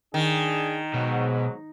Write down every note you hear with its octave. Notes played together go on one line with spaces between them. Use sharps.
D#3 D4 G#4
G#2 B2 F#3